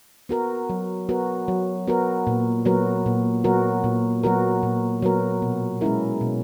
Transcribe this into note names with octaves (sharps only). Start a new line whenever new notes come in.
B3 F#4 A#4
F#3
B3 F#4 A#4
F#3
B3 F#4 A#4
A#2
F#3 B3 F#4 A#4
A#2
F#3 B3 F#4 A#4
A#2
F#3 B3 F#4 A#4
A#2
F#3 B3 F#4 A#4
B2
G#3 C#4 E4 A#4
B2